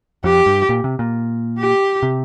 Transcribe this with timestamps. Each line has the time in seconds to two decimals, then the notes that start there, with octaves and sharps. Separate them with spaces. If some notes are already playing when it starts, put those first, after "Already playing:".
0.24 F2 G4
0.46 G2
0.69 A#2
0.84 C3
0.99 A#2
1.59 G4
2.03 C3